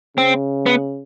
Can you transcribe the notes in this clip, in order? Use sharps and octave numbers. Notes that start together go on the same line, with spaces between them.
C#3 C4
B3